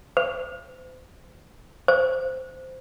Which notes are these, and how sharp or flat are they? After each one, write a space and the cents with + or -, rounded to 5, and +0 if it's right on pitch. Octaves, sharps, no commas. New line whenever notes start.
C5 -40
C5 -10